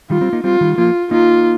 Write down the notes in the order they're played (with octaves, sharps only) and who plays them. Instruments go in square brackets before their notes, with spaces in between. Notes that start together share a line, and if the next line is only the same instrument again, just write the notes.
[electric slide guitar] D#3 G3 [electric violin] F4
[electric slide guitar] G3 C4
A#3 D#4
[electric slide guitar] G3 C4 [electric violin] F4
[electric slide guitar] D#3 G3
[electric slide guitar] F3 A#3 [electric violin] F4
[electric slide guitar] A#3 D#4 [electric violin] F4